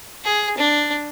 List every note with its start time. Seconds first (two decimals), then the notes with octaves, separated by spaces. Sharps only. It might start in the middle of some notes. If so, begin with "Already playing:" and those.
0.24 G#4
0.58 D4